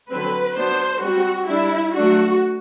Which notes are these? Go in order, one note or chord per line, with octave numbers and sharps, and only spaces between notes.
D3 F#3 C4 B4
F#3 B3 D4 C5
G3 C4 F#4
G3 D4 E4
F#3 A3 D4 F#4